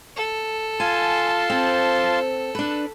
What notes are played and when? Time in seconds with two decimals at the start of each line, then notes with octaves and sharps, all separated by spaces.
0.16 A4
0.80 F4 G#5 A5 C6
1.50 C4
2.55 D4 B4